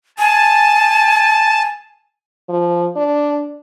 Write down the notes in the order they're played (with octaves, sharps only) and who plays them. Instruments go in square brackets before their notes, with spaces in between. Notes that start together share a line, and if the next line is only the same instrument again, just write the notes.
[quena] G#5 [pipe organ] A5
[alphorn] F3
D4